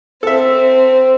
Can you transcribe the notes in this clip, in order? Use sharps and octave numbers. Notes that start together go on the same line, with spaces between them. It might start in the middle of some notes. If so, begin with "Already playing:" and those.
C4 A4 E5